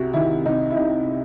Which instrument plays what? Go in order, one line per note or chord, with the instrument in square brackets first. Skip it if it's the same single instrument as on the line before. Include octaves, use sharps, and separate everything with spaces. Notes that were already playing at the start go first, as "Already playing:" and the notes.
Already playing: [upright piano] C2 C3 F#4
D#3 E4
C2 D#4
E4
C3 D#4